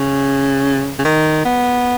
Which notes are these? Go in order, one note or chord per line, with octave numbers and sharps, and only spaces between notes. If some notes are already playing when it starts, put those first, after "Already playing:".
Already playing: C#3
C#3
D#3
B3